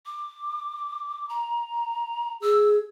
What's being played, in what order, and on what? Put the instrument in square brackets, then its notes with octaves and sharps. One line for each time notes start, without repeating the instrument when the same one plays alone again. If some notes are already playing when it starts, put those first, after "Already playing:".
[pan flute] D6
A#5
[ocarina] G#4 [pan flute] E6